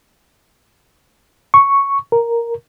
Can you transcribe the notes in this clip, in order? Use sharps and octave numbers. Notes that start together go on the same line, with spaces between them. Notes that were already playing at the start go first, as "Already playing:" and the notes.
C#6
A#4